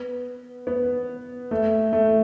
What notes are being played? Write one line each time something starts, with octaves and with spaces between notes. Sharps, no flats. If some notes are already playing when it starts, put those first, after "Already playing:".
Already playing: B3
B3
A3
A3